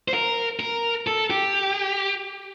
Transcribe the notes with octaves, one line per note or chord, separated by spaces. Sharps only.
C5
A#4
A#4
A4
G4